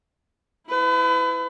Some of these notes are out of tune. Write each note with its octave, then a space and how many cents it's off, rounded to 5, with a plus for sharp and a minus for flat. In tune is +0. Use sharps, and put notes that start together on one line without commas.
E4 +0 B4 +35